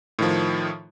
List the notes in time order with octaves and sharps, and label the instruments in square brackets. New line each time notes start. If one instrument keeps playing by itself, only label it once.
[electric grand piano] A2 D#3 F3